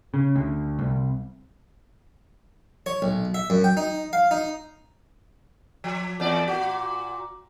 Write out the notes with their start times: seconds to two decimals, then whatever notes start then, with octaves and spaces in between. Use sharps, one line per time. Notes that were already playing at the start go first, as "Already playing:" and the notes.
0.14 C#3
0.36 D2
0.79 C2
2.86 C#5
3.02 B1
3.34 E5
3.50 F#2
3.64 G5
3.77 D#4
4.13 F5
4.31 D#4
5.84 F3
6.20 E2 D5
6.48 A#2 F#4